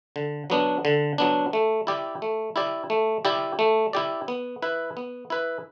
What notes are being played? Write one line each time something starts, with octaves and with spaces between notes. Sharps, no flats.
D3
F#3 B3 D4
D3
F#3 B3 D4
A3
E4 G4 D5
A3
E4 G4 D5
A3
E4 G4 D5
A3
E4 G4 D5
B3
E4 B4
B3
E4 B4